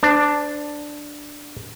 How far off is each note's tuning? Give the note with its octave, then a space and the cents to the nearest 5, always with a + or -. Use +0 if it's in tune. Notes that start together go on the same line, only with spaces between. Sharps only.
D4 +0 C5 -30